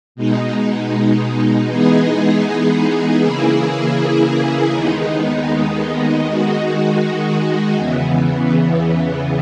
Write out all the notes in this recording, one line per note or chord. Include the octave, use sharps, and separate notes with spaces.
B2 G#3 D#4
E3 G#3 B3 D#4 G#4
C#3 E3 A#3 E4 G#4
D#2 D#3 G#3 B3 D#4
D#3 G#3 D#4 F#4
E2 C#3 E3 B3